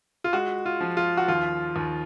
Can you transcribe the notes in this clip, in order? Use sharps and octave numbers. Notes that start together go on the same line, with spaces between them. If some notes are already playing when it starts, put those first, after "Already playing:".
F4
G#3 F#4
F4
F3
F4
F#4
D#2 F4
D#2